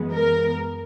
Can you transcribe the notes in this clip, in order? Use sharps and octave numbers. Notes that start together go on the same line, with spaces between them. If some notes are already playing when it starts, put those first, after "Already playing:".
Already playing: F#2 E3 G#3 B3
A#4